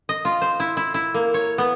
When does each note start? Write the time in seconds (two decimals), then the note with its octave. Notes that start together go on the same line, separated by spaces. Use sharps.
0.09 D#5
0.25 F4
0.41 C5
0.60 E4
0.77 E4
0.94 E4
1.14 A#3
1.34 C#5
1.58 B3